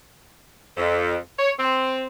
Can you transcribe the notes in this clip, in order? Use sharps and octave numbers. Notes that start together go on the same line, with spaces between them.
F2
C#5
C4